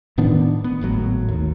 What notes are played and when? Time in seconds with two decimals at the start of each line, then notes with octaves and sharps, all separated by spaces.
0.18 A2 D#3 B3 D4
0.64 B3
0.81 G#1 A2 F#3
1.29 D#2